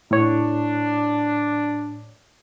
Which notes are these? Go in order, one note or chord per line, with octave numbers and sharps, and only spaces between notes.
A2 D4 C#5